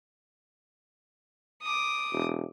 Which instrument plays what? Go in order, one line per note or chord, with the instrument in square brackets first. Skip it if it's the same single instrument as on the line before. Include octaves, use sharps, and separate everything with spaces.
[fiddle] D6 D#6
[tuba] E1